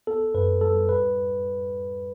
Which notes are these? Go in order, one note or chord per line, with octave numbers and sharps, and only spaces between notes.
B3 A4
F#2 B4
G3 A4
A2 B4